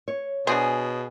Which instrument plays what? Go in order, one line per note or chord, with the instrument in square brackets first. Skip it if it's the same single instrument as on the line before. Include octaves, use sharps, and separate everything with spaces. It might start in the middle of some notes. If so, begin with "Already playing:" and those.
[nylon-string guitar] C#5
[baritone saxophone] B2 [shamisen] D4 F#4 C5 [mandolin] G#4